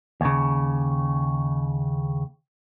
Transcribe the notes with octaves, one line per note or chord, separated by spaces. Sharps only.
D#2 C#3